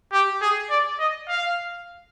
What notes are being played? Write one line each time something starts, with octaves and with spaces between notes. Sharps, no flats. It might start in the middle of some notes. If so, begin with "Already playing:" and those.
G4
G#4
D5
D#5
F5